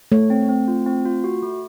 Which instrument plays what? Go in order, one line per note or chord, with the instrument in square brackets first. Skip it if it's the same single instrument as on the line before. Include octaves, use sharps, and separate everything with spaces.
[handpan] A3 [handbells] C#5
[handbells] C4
C4
F4
C4
F4
F#4
A3